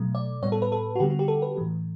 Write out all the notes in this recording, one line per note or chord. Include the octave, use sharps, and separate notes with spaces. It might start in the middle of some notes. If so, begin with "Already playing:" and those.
Already playing: B2 F#3 A3
D5
A2 G3 B3 C#5
A4
B4
A4
F#4
D3 G3 B3 G4
F#4
G4
A4
B4
A2 E3 A3